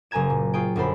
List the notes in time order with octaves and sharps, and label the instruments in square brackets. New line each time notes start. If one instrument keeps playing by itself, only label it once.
[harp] F#1 B4 G#5 A#5 G#6 E7
A#2
C#4 F4 G#4 G5
G1 F#2 A4 C5 B5